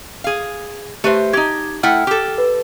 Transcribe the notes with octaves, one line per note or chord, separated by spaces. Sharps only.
G#4 F5
A3 G4 B4 C5 E5
D#4 G4 G#6
A3 E4 F#5 G5 F6
G4 A4
B4